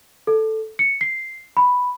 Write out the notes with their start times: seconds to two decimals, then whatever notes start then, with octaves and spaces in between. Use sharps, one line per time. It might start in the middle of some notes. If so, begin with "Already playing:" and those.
0.27 A4
0.79 C#7
1.01 C7
1.57 B5